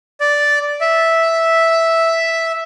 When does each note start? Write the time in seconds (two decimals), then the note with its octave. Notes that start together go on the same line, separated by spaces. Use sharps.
0.20 D5
0.81 E5